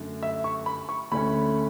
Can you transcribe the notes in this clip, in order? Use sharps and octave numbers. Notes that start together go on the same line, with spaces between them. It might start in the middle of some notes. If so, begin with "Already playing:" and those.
Already playing: F#2 D3 A3
E5
C#6
B5
C#6
D2 D3 A3 C#4 B5